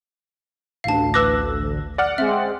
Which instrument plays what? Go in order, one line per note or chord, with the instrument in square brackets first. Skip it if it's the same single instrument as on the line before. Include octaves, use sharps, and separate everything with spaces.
[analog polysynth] A1 D2 [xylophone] F5 A5
[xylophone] B4 D6 [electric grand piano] E6 F#6 A#6
[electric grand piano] D5 F#5 F6
[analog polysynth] G#3 C4 [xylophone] E5